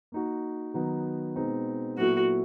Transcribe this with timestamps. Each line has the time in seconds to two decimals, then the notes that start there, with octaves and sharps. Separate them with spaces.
0.12 A#3 D#4 F#4
0.74 D#3 F#3 B3 D#4
1.36 B2 G#3 C4 D#4
1.98 A#2 F#3 B3 E4 F#4 A4